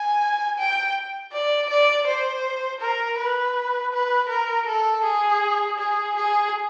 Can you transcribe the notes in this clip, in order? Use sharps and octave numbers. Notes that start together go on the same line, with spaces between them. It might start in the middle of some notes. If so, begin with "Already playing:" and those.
Already playing: G#5
G5
D5
D5
C5
A#4
B4
B4
A#4
A4
G#4
G#4
G#4